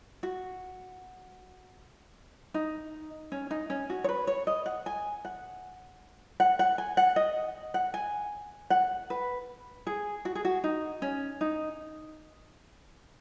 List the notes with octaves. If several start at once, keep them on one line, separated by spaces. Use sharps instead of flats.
F#4
D#4
C#4
D#4
C#4
F#4
C#5
B4
C#5
D#5
F#5
G#5
F#5
F#5
F#5
G#5
F#5
D#5
F#5
G#5
F#5
B4
G#4
F#4
G#4
F#4
D#4
C#4
D#4